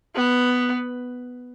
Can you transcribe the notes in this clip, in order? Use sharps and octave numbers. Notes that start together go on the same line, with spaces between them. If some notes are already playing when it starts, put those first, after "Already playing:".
B3